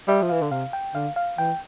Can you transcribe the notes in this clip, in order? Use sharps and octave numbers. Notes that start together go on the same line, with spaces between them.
G3 E5
F3
E3 F5
D3
C3 F5
G5
D3 F5
F5
E3 G5